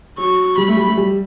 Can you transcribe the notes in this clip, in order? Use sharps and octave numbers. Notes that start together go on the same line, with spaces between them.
F#3 C#6
G3 B5
A3
G3
A3
G3